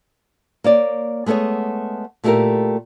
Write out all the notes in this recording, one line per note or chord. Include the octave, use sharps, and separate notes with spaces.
A#3 C#5 D5
G#3 A3 B3 G#4 C#5
A#2 A3 E4 F4 G4 A#4